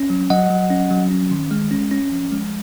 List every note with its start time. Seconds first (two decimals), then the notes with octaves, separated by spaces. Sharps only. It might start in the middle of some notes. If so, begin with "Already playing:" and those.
Already playing: C#4
0.10 F#3
0.30 F#3 D#5 F#5
0.50 F#3
0.70 C#4
0.91 F#3
1.11 C#4
1.31 D#3
1.51 G#3
1.71 C#4
1.91 C#4
2.12 F3
2.31 G#3